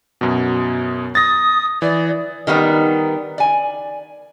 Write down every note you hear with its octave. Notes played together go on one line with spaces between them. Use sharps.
F#2 B2
D#6 A6 A#6
E3 D5
D#3 G3 B3 D#4
D5 G#5